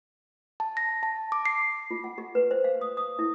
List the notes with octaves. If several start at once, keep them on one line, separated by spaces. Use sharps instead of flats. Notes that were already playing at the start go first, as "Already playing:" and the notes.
A5
A#6
A5
D6
C7
F4
F#5
G4
B4
C5
F5
D#6
D#6
E4